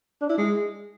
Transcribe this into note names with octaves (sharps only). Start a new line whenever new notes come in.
D4
E4
G#3